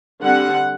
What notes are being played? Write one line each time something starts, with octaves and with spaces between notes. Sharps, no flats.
D3 G3 C4 F#5